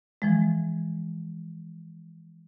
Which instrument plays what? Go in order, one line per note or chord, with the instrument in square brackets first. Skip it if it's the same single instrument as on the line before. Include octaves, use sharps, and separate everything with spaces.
[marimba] E3 F3 G#3